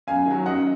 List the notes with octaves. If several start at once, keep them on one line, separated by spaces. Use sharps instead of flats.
F#2 F5 G#5
D#3 F#3
F#2 D#5 F#5